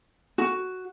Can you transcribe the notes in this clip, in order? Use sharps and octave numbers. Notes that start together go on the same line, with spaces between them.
F#4